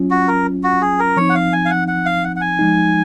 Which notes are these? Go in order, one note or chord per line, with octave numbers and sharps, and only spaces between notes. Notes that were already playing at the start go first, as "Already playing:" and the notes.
Already playing: F#3 C#4 F4
F#4
A#4
F#4
G#4
A#4
F3 C4 D#4 C#5
F#5
F5
G#5
F5
F#5
F#5
F5
F#5
F#5
G#5
F3 G#3 D#4